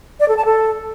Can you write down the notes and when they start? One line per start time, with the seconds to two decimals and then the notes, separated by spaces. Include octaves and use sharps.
0.20 D5
0.28 A4
0.37 A5
0.45 A4